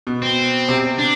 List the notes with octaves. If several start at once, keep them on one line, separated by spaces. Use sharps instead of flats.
B2
C4
C3
D4